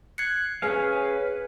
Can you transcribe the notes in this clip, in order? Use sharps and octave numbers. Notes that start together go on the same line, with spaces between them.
F#6 G#6 C7 C#7
C#4 G#4 B4 F5